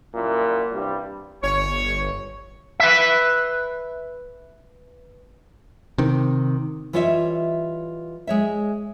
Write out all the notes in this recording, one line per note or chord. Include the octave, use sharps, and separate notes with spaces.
F#2 A#2 G3 E4
C2 G2 G3
G1 C#5
B4 E5
C3 D#3
E3 G3 F4 C#5 D#5 E5
G#3 C#5 E5